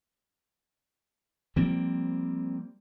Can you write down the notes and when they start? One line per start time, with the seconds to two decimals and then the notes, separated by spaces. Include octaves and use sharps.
1.56 F3 G3 A#3 C4